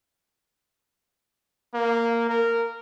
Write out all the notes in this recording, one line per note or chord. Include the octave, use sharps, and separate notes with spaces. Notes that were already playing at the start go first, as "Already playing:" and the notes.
A#3
A#4